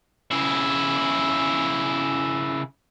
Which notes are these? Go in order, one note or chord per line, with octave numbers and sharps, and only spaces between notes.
C#3 E4